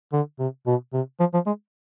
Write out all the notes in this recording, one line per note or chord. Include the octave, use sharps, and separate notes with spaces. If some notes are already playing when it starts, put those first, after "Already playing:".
D3
C3
B2
C3
F3
F3
G#3